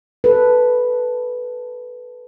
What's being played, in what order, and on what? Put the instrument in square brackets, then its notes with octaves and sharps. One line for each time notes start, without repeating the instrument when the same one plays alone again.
[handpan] A4 B4